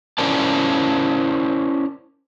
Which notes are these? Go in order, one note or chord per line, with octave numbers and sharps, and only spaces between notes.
C#4 E4 A#4 C5 D5 A5